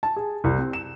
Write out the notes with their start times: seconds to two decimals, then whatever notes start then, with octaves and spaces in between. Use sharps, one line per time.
0.03 A5
0.16 G#4
0.44 C2
0.58 C4
0.73 E7